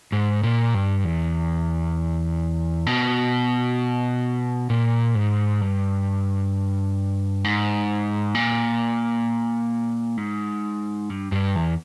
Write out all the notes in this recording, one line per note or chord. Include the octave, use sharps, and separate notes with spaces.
G#2
A#2
G2
E2
B2
A#2
G#2
G2
G#2
A#2
G#2
G2
G2
E2